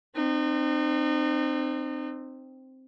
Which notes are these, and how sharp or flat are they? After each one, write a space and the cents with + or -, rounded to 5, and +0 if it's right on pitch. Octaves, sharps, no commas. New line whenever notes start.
C4 +0 D#4 -40